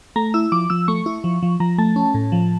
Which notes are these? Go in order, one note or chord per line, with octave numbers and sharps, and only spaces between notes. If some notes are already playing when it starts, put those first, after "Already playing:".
A3 A#5
E4 E6
F3 D6
F3 E6
A3 C#6
E4
F3
F3
F3 A#5
A3 A5
C#4
A2
F3